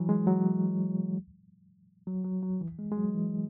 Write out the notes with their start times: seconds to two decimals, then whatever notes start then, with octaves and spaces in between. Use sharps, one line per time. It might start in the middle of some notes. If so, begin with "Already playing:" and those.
Already playing: E3 F#3
0.09 G#3
0.27 F#3
2.07 F#3
2.25 F#3
2.43 F#3
2.61 E3
2.79 G#3
2.92 G#3
2.97 F#3
3.14 E3